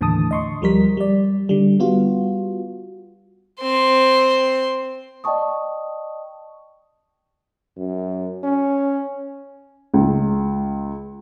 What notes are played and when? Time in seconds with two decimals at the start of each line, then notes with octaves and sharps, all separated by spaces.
0.01 D#2 A2 D3 E3 A5 D#6
0.31 D#5 C6 C#6
0.61 D2 F3 G3 A#4 B6
0.97 G3 D5
1.49 D3 G3
1.79 G3 B3 F4 F#4
3.61 C4 C6
5.24 D5 D#5 G5 A5 C#6 D#6
7.78 F#2
8.44 C#4
9.94 C#2